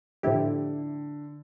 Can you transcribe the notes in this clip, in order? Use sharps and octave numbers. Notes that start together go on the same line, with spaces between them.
A2 D3 F3 A3 E4 G4